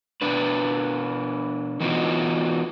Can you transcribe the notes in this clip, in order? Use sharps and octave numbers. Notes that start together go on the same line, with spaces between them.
B2 D4 B4
E3 B3 D#4 F4 F#4